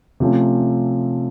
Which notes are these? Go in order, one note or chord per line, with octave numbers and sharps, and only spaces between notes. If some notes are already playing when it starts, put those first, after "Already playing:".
C3 F3 A3 C#4